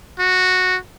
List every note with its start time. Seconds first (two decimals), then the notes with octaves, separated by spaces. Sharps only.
0.19 F#4